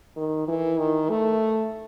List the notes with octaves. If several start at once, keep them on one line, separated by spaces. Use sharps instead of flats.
D#3
E3
D#3
A3